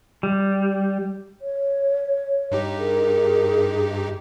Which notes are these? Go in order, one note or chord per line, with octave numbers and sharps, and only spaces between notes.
G3
C#5
G2 D#4 G4
G#4 A#4